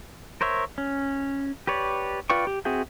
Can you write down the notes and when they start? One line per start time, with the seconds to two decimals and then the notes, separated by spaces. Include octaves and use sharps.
0.41 A#4 C5 C#5 E5
0.78 C#4
1.67 G4 B4 C#5 D5
2.30 F4 B4 D5 G5 C#6
2.47 G4
2.65 C4 F#4 G#4 E5 G5